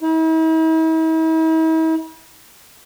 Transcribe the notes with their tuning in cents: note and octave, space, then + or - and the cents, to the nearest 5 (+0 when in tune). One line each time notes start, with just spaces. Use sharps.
E4 -45